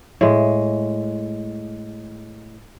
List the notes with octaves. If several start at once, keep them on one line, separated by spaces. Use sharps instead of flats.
A2 G#3